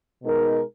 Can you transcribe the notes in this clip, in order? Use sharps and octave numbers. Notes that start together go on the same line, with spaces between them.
B2 G#3 D#4 A#4